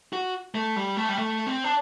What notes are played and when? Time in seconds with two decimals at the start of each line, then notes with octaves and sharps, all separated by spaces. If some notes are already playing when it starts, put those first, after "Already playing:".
0.13 F#4
0.55 A3
0.76 G3
0.97 A3
1.09 G3
1.18 A3
1.47 C4
1.64 D4